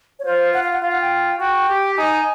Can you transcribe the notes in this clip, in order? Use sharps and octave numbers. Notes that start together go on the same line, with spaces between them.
C#5
F4 C5
F#5
F5
F#5
F4 F5
F#5
G5
F#4 G5
G4
D#4 G#5